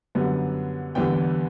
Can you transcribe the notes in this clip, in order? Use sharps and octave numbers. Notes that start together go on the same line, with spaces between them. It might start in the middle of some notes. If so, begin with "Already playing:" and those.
F#2 D3 G3 B3
E2 D3 G3 B3 G5